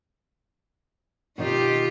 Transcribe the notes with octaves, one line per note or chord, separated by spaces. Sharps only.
B2 D#3 D#4 F4 G4